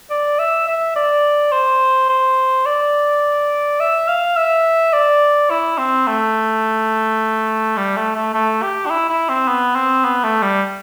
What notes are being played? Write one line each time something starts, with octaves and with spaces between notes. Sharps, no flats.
D5
E5
E5
D5
C5
C5
D5
E5
F5
E5
D5
E4
C4
A3
G3
A3
A3
A3
G4
D4
E4
E4
C4
B3
C4
B3
A3
G3